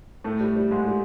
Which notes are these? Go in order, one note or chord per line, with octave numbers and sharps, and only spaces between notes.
A2 A3
G3
G3
G#2 G#3
G3